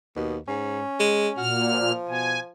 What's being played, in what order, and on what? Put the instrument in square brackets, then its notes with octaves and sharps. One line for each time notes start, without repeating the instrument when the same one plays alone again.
[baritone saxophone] D#2 [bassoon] B2
[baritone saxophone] G#2 [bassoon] C#4
[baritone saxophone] G#3
[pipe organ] A#2 F6 [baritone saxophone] F#4
[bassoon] F3
[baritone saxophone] B2 [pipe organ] G#5